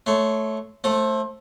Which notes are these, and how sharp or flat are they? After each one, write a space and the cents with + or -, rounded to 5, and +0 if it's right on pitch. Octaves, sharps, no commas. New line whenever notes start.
A3 -10 C#5 +0 C6 -15
A3 +0 C5 +30